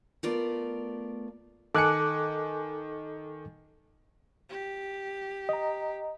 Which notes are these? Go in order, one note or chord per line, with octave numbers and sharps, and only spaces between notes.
A3 B3 F4 A#4 D5
D#3 A4 G#5 D6 F#6 C#7
G4
D#5 A#5